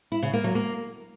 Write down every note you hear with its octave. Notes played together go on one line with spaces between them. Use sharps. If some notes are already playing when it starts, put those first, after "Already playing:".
E4
C#3
A#3
F#3
A#3